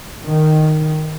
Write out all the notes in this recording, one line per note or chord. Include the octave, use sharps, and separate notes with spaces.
D#3